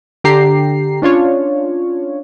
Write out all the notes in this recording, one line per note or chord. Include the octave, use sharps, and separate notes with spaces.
D3 G4 A#5 C7
C#4 D4 F4 C#5